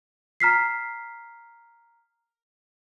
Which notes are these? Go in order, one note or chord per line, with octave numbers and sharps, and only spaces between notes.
A#5 F6 B6 C7